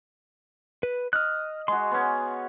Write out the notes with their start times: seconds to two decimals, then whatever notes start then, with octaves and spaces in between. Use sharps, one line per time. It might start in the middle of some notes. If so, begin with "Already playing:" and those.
0.83 B4
1.13 D#5 F6 F#6
1.68 G#3 F#4 C6
1.91 B3 C#4